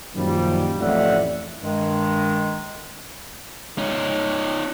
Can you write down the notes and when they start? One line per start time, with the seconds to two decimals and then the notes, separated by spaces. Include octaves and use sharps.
0.16 F#2 A#2 D#3 F3 G3
0.79 A1 F2 A2 D5 E5 F#5
1.61 G2 D#3 G#3
3.78 C#4 D#4